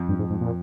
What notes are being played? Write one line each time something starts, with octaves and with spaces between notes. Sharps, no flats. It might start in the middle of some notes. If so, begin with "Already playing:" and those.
Already playing: F2
G2
G#2
G#2
A#2